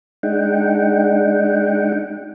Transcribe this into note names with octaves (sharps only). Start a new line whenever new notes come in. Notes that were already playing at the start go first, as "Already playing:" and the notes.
G#3 D4 D#4 F#5 G5